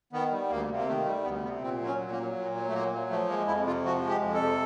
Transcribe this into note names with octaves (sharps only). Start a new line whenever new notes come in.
D#3 B3
G3
D2 A#3
C3
A#3
D#3 A3
G3 A3
D2 B3
C3 B3
A#2 C4
F#3
C#4
A#2
A#3
F#3
A#2
F#3
A3
A#2 A#3
F#3
F3 A3
G#3 A#3
F2 E4
C3 F4
F3 F#4
G#3
G4
F2
A4
C3